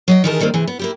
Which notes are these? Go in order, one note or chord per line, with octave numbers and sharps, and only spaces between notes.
F#3 D#5 G5
D#3 E3 G4 G#4 A#4 A5
D3 D#3 G3 A#3 C4
C3 E3 G#4
B3
A#3 E4 G4